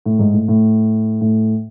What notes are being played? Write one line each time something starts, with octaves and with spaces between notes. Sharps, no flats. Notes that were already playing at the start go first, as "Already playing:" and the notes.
A2
G#2
A2
A2
A2